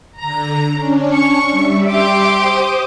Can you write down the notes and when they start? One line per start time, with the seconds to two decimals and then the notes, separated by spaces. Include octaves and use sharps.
0.21 D3 A#5
0.74 C#4 D4
1.13 C#6
1.51 G3 E5
1.88 G4 C6 D6
2.37 C5 D#6